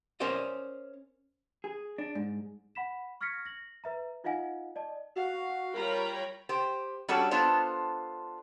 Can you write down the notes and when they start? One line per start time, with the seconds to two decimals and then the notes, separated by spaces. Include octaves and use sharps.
0.20 C#4 A#4 C5 D5 D#5
1.64 G#4
1.98 D4
2.15 G#2
2.75 F#5 B5 B6 E7
3.21 C#6 F6 G#6 A#6 B6 C#7
3.45 A#6 F#7
3.84 B4 E5 A#5
4.24 D#4 F4 D#5 F5 F#5 G#5
4.76 D5 D#5 A5
5.16 F#4 F5
5.74 G3 F4 A#4 C#5 G5 A#5 B5
6.49 G4 C5
7.08 G3 C#4 D4 F#4 A4
7.31 B3 D4 F4 A4 C5